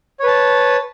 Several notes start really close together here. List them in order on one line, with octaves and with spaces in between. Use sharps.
C#5 B4 A5